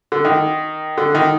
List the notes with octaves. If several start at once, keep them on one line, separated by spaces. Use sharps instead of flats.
D3
D#3
D3
D#3